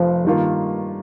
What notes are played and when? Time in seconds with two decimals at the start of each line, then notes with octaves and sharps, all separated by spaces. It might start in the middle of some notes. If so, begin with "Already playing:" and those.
Already playing: F1 F2 F3
0.25 G2 D#3 A#3 F4